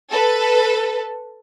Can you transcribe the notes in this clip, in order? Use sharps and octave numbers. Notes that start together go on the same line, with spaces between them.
A4 B4